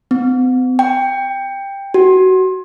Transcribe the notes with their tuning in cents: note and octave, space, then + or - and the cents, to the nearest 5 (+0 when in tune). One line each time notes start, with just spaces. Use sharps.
C4 -45
G5 +15
F#4 +20